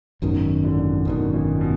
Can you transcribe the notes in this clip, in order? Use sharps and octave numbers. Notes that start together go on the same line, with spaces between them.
G#1 F#2 B2 D#3
A#2 D3
G#1 F#2 B2 D#3
A#2
B2